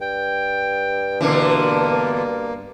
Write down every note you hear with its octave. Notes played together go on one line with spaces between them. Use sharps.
G2 G5
B2 D3 E3 A#3